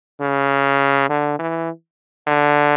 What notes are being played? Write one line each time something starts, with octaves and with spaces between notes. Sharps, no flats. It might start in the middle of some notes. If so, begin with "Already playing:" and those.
C#3
D3
E3
D3